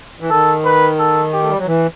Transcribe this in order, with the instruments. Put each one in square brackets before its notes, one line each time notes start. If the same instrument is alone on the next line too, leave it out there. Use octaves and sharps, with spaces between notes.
[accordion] E3
[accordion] D#3 [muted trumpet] A4
[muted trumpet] B4
A4
G4
[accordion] A3
G3
F#3
E3